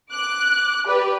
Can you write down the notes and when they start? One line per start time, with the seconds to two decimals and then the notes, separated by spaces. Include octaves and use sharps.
0.12 D6 F#6
0.86 G4 B4 D5